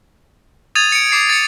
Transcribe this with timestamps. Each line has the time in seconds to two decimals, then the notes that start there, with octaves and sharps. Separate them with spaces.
0.75 D#6 G#6 A6 D#7 F7
0.92 C#7 D7
1.12 D6 C7
1.30 A6 C#7